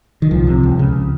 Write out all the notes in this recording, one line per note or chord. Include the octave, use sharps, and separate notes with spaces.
D#3
C2 F3
C3
C#2
C#3